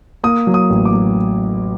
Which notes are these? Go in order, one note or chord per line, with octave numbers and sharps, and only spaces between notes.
A#3 D#6
F#3
D#6
A1
D6
F#3